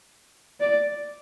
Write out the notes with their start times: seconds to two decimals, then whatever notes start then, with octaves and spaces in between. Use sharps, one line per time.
0.61 D5